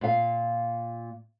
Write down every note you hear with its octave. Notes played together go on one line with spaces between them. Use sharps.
A#2 F5